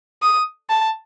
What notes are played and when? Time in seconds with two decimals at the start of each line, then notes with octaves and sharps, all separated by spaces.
0.23 D#6
0.70 A5